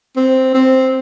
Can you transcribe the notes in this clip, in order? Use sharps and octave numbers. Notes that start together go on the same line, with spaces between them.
C4
C4